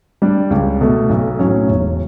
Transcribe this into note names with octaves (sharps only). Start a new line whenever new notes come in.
G3 D4
C#2
B2 A3
B1
A2 F#3 C#4
E1